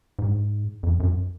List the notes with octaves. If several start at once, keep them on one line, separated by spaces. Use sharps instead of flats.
G#2
F2
F#2